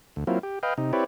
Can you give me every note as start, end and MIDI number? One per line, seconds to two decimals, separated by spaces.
0.16 0.24 38
0.27 0.39 54
0.27 0.39 58
0.27 0.39 60
0.27 0.39 64
0.27 0.39 65
0.43 0.59 67
0.63 0.74 71
0.63 0.74 75
0.63 0.74 77
0.63 0.74 79
0.78 0.92 48
0.78 0.92 63
0.93 1.04 60
0.93 1.04 64
0.93 1.04 67
0.93 1.04 71
0.93 1.04 73
0.93 1.04 74